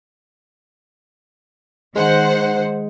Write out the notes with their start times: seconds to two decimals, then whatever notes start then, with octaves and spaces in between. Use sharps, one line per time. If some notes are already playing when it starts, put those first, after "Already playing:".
1.96 D#3 G#3 C5 F#5